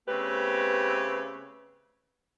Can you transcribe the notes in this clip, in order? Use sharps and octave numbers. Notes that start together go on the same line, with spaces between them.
C#3 A3 B3 C4 G4 B4